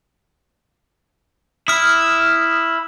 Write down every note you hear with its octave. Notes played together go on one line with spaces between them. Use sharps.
E4 D#6 F6